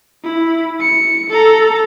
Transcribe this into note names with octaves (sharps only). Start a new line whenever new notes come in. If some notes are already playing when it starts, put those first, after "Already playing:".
E4
C#7
A4 A#5